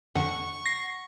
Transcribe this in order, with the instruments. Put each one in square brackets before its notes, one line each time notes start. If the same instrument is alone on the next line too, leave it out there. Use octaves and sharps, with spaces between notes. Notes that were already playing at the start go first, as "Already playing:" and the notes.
[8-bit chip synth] F2 D3 [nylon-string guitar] F#5 [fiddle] C#6
[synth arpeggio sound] A#6 C7